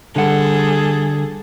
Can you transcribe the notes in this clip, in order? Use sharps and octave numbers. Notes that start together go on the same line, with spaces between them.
D3 G3 G#4 A4 F#5